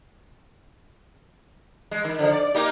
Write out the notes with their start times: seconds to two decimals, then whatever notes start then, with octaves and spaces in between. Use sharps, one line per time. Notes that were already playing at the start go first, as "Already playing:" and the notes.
1.91 G#3
2.04 D#3
2.18 D3 F3
2.32 D5
2.54 A#3 D#4 G4